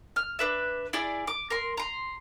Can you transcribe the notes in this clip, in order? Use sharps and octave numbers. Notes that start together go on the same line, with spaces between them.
F6
D4 B4 E5
E4 G#4 D5
D6
A#4 C6
A#5 C6